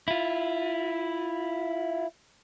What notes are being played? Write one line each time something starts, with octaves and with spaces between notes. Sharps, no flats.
E4 F4